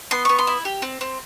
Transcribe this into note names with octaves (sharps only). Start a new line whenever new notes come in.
B3 C6
B3 C#6
C6
E4
G4
C4
C4